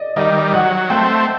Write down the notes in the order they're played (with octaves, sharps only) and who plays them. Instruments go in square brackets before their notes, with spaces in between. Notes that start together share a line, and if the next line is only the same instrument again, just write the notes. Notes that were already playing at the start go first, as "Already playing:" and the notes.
Already playing: [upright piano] D5 D#5
[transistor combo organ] D#3 G3 [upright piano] D#5
[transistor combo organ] F#3 [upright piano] F#5
[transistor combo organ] A3 C4 [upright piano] G5